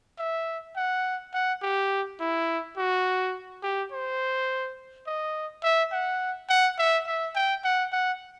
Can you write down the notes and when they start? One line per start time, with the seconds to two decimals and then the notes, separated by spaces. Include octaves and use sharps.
0.19 E5
0.76 F#5
1.34 F#5
1.62 G4
2.20 E4
2.77 F#4
3.63 G4
3.92 C5
5.07 D#5
5.63 E5
5.92 F#5
6.49 F#5
6.78 E5
7.07 E5
7.35 G5
7.64 F#5
7.92 F#5